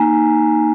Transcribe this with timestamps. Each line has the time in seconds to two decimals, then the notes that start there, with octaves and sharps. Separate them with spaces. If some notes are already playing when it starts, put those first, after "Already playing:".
Already playing: A#3 D#4 G#5 A#5